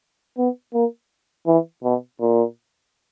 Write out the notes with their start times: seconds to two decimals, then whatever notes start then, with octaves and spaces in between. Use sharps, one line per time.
0.38 B3
0.74 A#3
1.47 E3
1.84 B2
2.21 A#2